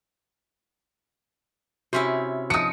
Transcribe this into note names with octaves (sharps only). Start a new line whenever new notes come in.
C3 C#4 E4 F#4 C6 B6
F3 D#4 D#6 C#7